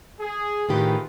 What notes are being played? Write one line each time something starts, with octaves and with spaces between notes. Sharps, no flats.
G#4
A2 D#3 F4 G4 G#4 B4